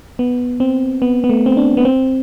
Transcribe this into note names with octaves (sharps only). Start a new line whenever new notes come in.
B3
C4
B3
B3
A3
C4
D4
B3
C4